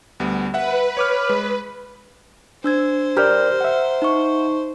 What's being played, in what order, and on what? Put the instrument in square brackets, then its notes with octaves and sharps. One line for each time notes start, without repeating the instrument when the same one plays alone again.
[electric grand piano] D2 G3 B3
[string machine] B4 [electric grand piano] E5 F#5
[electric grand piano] C#5 D6 F6
G#3
[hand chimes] D4 E6 G#6 [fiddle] C5
[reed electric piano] G4 A#4 D5 [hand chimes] A#5 F6 G6
[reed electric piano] E5 F#5
[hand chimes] D#4 C#6